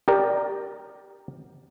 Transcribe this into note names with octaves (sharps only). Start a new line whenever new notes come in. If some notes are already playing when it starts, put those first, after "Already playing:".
G4 A#4 D5